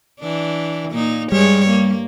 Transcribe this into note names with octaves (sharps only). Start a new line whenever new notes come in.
E3 D4
A#2 A#3 D#4
G2 G3 G#3 C#5
A#3